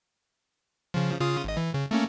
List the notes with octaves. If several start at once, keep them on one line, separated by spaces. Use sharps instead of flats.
C#3 F3
C#3 F4 D#6
G#1 D#5
E3
C#3
A3 A#3 C#4